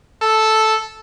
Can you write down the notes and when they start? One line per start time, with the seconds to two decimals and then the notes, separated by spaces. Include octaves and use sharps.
0.22 A4